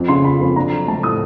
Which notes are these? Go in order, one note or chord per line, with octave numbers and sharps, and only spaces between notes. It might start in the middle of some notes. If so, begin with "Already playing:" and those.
Already playing: F2
C#3 C6
F3 B5
F2
D4 A#5
F#3
A3 A5
A2 D#6